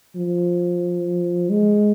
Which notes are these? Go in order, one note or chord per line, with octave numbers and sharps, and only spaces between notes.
F3
G#3